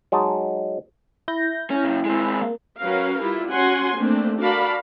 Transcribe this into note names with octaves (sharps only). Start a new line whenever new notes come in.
F#3 G#3 D#4 A5
E4 G6 A#6
C#4
F#2 C#3
G#3 C4
A#3
F#3 C#4 F#4 A#4 B4 F5
G3 E4 F4
C#4 F#4 F#5 G#5 C6
A3 A#3 C4 D4
F#4 A#4 D5 F5 A5 B5